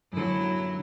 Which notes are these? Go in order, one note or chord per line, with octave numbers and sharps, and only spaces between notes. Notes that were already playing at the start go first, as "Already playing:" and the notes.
F#2 D3 F#3 E4